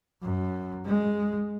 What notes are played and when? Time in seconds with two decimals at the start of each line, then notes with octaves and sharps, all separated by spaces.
0.22 F#2
0.86 G#3